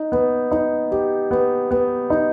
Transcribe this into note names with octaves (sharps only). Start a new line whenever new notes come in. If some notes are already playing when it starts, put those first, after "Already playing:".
Already playing: D#4
B3
D#4
G4
B3
B3
D#4